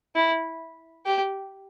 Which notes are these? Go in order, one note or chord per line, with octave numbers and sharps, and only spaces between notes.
E4
G4